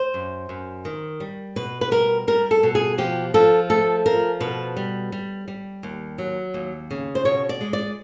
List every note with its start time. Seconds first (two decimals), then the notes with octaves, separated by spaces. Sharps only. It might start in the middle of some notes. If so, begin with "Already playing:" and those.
Already playing: C5
0.14 F#2
0.49 F#2
0.85 D#3
1.20 G3
1.56 B2 B4
1.81 B4
1.91 G3 A#4
2.27 G3 A#4
2.51 A4
2.63 B2
2.75 G#4
2.98 F3 G4
3.34 F3 A4
3.70 A3 A4
4.06 F3 A#4
4.40 B2 B4
4.77 G3
5.12 G3
5.48 G3
5.83 D#2
6.18 F#3
6.54 D#2
6.91 C#3
7.15 C5
7.25 B2 C#5
7.49 D5
7.61 G#3
7.73 D5